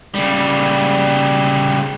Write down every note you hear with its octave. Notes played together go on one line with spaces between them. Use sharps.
C#3 G3